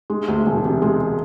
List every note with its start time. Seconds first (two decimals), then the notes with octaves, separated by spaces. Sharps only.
0.10 G#3
0.28 D2
0.46 E1
0.65 C3
0.82 G#3